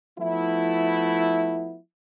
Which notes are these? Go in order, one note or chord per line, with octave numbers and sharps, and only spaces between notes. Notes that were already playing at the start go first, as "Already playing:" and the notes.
F3 A3 B3 E4